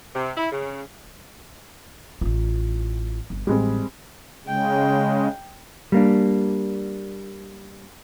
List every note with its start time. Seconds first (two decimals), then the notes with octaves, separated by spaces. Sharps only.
0.14 C3
0.36 E4
0.52 C#3
2.21 A1 F4
3.30 G1
3.47 A1 G3 G#3 C4
4.47 C#3 G#3 G5
5.92 G3 A#3 D4